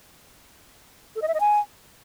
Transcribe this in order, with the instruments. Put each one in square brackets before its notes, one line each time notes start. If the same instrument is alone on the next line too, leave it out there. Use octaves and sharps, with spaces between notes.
[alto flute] A4
D#5
E5
D#5
G#5